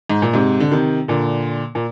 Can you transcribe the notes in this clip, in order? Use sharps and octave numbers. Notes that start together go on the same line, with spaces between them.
G#2
A#2
G#2 C3
D3
C3 D#3
A#2 D3
A#2